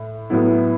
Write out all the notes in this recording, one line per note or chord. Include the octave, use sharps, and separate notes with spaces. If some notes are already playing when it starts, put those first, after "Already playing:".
Already playing: A2
A2 F#3 B3 E4